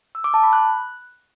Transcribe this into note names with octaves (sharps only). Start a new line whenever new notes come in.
E6
D6
A5
B5
F#6